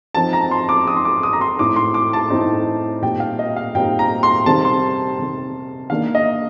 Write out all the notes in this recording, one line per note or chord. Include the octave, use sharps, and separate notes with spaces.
F3 C4 D#4 A5
A#5
C6
D6
F3 C4 D#4 D#6
C6
D6
D#6
A#5
C6
A2 A3 C4 D#4 D6
C6
D6
A5
A2 A3 C4 D#4
A#2 G3 C4 D#4 G5
F5
D#5
F5
A#2 G3 C4 D#4 G5
A#5
C6
C3 D#3 G3 C4 A5
C6
C3 D#3 G3 C4
D#3 A#3 D4 F5
D#5